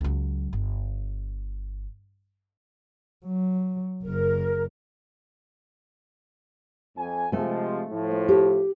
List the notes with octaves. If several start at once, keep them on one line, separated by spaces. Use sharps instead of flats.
C#2 F#3
G1
F#3
F#1 A#4
F2 G#5
C3 F3 G#3 A3 G#5
A2 F3
G4